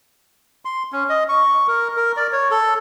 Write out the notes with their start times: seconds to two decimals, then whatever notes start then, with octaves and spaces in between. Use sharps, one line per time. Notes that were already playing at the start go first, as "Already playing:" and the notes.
0.65 C6
0.92 C#4
1.09 D#5
1.29 C#6
1.67 A#4
1.97 A#4
2.17 D5
2.32 C#5
2.51 A4